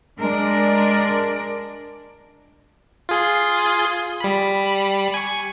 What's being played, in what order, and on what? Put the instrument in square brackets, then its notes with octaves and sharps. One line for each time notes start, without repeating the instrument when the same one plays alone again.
[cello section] G#3 D4 A#4 D5
[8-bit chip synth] F4 G#4 C6
G3 B5
G#5 C#6